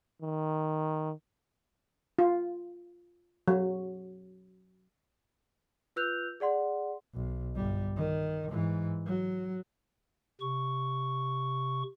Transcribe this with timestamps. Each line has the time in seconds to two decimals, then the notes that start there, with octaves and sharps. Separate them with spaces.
0.22 D#3
2.19 F4
3.48 F#3
5.96 F4 B4 E6 F#6 G6 F7
6.40 G#4 D5 F#5 C6
7.14 B1
7.56 G1 G3
7.97 D#3
8.49 G#2 E3
9.06 F#3
10.41 C3 C#6